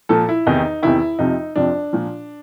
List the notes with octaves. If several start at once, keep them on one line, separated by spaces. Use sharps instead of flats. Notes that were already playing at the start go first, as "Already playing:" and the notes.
A#2 F3 A4
E4
E2 C3 D#3 D#4
E2 C3 D#3 E4
F2 C3 F3 D#4
F2 C3 F3 D4
A#2 F3